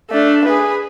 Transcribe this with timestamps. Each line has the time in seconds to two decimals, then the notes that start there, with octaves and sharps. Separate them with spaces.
0.11 A3 D4
0.45 G#4 B4